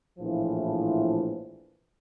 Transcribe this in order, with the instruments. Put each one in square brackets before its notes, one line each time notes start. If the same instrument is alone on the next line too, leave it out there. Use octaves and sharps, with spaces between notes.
[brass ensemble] A#1 A2 E3 F3